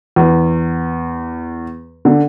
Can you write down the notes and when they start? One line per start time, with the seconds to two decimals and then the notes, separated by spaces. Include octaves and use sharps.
0.16 E2
2.05 D3